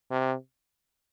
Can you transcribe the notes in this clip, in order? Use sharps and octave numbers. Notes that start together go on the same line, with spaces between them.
C3